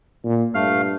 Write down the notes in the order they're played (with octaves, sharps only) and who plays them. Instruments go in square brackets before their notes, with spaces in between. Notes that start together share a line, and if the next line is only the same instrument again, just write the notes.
[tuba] A#2
[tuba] G2 [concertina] A3 F5 F6